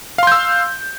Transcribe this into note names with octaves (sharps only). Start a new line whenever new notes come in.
F5 C6 E6 G6